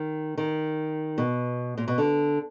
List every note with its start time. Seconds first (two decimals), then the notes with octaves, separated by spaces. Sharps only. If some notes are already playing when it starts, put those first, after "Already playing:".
Already playing: D#3
0.38 D#3
1.18 B2
1.78 A#2
1.88 B2
1.98 D3